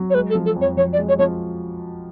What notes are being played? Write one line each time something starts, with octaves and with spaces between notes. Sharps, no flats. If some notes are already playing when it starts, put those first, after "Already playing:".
Already playing: F#3
C#5
G#3 B4
A4
F3
A4
F2 C#5
F3 C#5
D5
G#3
C#5
F3 C#5